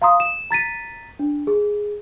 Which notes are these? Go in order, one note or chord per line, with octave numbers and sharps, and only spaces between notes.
F5 A#5 C6 D#6
E7
A#5 A6 B6 D#7
D4
G#4